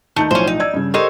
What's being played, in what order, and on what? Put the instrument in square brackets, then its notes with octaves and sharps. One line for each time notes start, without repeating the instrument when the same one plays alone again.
[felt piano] D#2 D#4 G6 [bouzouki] A3
[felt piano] B1 A2 F3 [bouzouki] C#4 C5
[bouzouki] D#4
[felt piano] D5 E6 G#6
G2 C#3
[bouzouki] D#4 C5 C#5 [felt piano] G4 A4 A#4